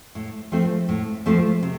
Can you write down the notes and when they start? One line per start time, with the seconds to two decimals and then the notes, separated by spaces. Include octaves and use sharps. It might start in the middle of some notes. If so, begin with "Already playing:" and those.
0.15 A2
0.52 F3 A3 C4
0.89 A2
1.26 F3 A3 C4
1.63 C3